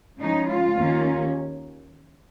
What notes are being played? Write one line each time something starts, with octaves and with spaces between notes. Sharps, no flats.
C#3 F3 G#3 C#4 D#4
F4
D#2 D#3 A#3 C#4